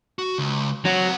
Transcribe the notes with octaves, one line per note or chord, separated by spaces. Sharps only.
F#4
C#2
F#3 C4 F#5